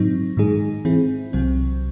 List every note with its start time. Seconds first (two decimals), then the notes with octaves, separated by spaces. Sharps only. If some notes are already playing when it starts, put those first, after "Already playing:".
Already playing: G#2 F#3 C4 D#4
0.37 G#2 D#3 G#3 D#4 G#4
0.85 E3 C4 E4 G#4
1.33 C2 C3 F#3 C4